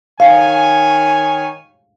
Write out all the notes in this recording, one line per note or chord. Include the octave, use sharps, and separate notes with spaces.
D#3 C#5 F5 G#5